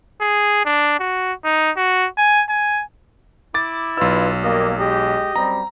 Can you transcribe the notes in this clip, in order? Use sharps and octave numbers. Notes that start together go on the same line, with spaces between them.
G#4
D4
F#4
D#4
F#4
G#5
G#5
E4 D6 A6
B1 D#4 F4 B4 E6
G3 A#3 D#5
G#3 G4 D#5
F#2 G3 C4 A#5